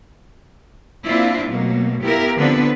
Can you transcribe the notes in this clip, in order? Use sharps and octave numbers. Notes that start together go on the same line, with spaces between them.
A#3 C4 D4 E4 F4
B2 F#3 A3 A#3
B3 E4 F4 G4 A#4
D3 F3 B3 C4 D4 B4